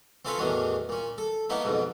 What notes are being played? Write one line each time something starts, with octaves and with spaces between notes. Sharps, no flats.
C4 C#4 F4 A4 B4 C#5
E2 A2 D#3 F#3 C#4 D4
A#2 C#4
A4
A#3 B3 C#4 D#4 E4
B1 F2 G#2 B2